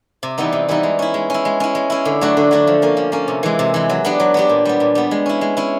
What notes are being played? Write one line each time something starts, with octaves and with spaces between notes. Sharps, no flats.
C3
E3 G3 B3 D#4
C3
E3 G3 B3 D#4
G#3
C#4 E4
G#3
C#4 E4
G#3
C#4 E4
G#3
C#4 E4
D3
F#3 A3 D4 F#4
D3
F#3 A3 D4 F#4
F3
A#3 C#4
F3
A#3 C#4
C3
E3 G#3
C3
E3 G#3
F#3
B3 D4 G4
F#3
B3 D4 G4
A#2
G3 B3
A#2
G3 B3
G#3
C#4 E4
G#3
C#4 E4